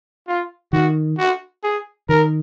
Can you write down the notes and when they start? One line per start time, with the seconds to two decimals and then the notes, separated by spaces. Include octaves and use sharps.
0.28 F4
0.73 D#3 F#4
1.18 F#4
1.64 G#4
2.09 D#3 A#4